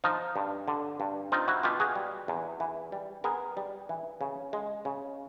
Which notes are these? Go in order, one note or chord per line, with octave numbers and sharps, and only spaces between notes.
F3 D#4 F4
G2
D3
G2
C4 D#4 F4
E4 F#4
B2 F4 G4
F#4 G#4
G3
E2
E3
G3
B3 G#4 A#4
G3
E3
C#3
G#3
C#3